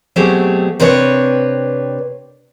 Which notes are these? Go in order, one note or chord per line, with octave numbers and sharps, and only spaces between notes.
B2 F#3 A3 C4 G4 G#4
C3 C4 D4 B4 C#5